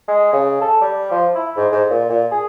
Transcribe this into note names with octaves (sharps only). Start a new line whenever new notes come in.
G#3
C#3
A4
G3
F3
E4
G#2
G#2
A#2
A#2
G#4